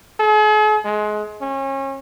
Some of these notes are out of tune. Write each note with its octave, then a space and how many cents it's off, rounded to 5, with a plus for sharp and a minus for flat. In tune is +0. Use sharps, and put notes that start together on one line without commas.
G#4 +45
G#3 +25
C#4 -30